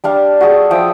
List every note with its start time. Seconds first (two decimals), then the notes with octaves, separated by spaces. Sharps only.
0.04 G3 D4 F5
0.41 F#4 G#4 A4
0.71 F3 E5 G5 D#6